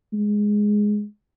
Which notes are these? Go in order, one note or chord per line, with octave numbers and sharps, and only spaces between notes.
G#3